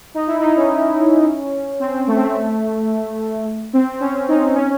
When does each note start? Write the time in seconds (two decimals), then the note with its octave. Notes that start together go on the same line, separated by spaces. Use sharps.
0.14 D#4
0.27 E4
0.41 D#4
0.56 C#4
1.80 C4
2.07 A3
2.16 C4
2.23 A3
3.73 C4
4.00 C#4
4.28 D#4
4.55 C#4